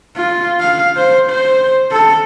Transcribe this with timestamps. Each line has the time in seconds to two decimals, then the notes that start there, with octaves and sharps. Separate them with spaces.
0.17 F4
0.60 F5
0.96 C5
1.30 C5
1.92 A4